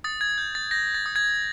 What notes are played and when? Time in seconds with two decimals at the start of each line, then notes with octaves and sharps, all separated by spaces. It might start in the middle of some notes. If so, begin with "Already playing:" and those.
0.04 D#6 A6
0.21 G#6
0.38 G6
0.55 A6
0.71 G6 A#6
0.94 A6
1.06 D#6
1.16 G#6